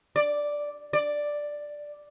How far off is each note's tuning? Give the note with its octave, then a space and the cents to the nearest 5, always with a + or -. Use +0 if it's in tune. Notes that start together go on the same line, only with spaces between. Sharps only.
D5 +0
D5 +5